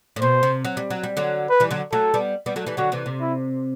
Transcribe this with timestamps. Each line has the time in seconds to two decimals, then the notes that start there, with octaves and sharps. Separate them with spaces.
0.16 A2
0.21 B2 C5
0.43 C3
0.65 F#3
0.77 G3
0.90 F#3
1.04 G3
1.17 D3 F#3
1.50 B4
1.60 E3 G3
1.71 D3 F#3
1.92 F#3 A3 A4
2.14 G3 B3
2.46 G3 B3
2.56 F#3 A3
2.67 E3 G3
2.77 D3 F#3 F#4
2.92 C3 E3
3.06 C3
3.21 E4